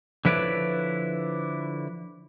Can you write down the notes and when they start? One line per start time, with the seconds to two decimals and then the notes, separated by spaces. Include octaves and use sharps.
0.25 D3 F3 E4 B4 C#5 D5